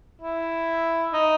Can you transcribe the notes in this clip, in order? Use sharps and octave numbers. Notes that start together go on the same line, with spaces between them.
E4
D#4